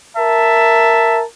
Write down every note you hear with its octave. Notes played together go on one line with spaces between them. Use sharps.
A#4 E5 A5